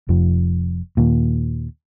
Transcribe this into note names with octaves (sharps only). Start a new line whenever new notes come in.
F1 F2 F3
D#2 A#2